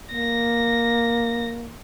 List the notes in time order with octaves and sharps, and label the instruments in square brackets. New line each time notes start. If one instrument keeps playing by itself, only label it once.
[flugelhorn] A#3 [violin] A#6